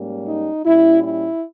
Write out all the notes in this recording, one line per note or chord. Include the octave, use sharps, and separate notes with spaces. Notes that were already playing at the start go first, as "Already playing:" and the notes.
Already playing: G#2 G3 A#3 C#4
D#4
A#2 G3 C#4 E4
E4